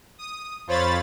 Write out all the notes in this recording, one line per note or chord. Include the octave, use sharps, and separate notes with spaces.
D#6
F2 F4 C5 C#5 B5 A6